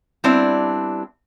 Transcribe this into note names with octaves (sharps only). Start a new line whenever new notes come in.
G3 B3 C4 D4 E4